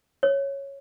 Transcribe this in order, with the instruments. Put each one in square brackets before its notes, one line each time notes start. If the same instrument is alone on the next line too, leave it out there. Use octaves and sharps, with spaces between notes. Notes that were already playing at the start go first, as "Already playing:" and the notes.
[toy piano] C#5